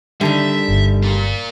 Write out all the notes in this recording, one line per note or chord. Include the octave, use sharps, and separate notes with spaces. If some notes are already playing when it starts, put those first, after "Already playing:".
D3 D#3 G3 A4 E5
G1
F4 A#4